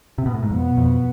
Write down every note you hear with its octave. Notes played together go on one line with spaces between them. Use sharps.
C3
B2
A2
G#2
F2 B2 B3
F2